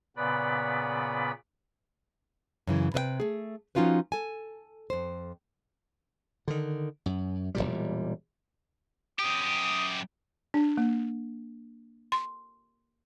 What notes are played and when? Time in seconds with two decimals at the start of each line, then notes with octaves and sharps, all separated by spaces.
0.17 A#2 C#3 B3 B4 D5 B5
2.67 F#2 C#3 E3
2.94 C3 B4 D#5 G5
3.20 A3 G#4
3.75 F3 C#4 D#4 F4 F#4 B4
4.12 A4 G#5
4.90 F2 C5
6.48 D3 D#3
7.06 F#2
7.55 E1 C#2 A#2 G3
9.19 F#2 G4 D#6
10.54 D4
10.77 A#3
12.12 C6